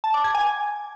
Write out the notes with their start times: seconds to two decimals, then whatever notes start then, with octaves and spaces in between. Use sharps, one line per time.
0.04 A5
0.14 D6
0.24 G#6
0.35 G#5